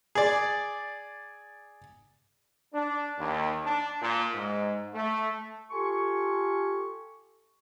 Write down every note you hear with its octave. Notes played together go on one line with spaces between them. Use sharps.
G#4 D5
D4
D#2
D4
A#2
G#2
A3
F4 G4 A4 G#5 C6 C#6